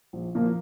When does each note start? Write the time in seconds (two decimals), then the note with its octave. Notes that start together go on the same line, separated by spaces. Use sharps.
0.13 A#1
0.35 A#2 F3 A#3